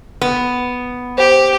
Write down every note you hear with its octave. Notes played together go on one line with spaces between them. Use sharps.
B3
G4 C5